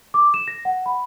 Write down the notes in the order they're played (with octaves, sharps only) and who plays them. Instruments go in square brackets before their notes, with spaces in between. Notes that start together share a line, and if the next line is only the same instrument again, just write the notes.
[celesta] D6
E7
A#6
F#5
B5